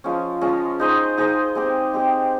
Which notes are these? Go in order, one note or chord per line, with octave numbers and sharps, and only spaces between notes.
F3 G#3 C#4
F3 G#3 C#4
D#4 G#4 C5 D#5
D#4 G#4 C5 D#5
G#3 C4 G4
G#3 C4 G4